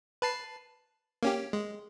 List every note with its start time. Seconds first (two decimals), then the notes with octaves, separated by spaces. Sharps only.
0.22 B4 A5 C7
1.23 A#3 C#4 G4
1.53 G#3